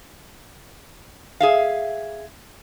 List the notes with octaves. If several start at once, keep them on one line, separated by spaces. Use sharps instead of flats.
G#4 E5 F5